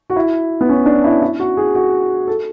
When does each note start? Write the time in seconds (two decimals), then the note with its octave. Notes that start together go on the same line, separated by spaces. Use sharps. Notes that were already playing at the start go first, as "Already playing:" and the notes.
0.10 F#4
0.16 E4
0.61 B3
0.69 C#4
0.86 D4
1.04 E4
1.21 E4
1.39 F#4
1.57 G#4
1.75 F#4
2.27 A4